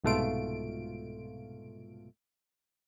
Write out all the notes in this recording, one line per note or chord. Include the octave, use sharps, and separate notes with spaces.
C2 G#2 B2 A3 F4 D7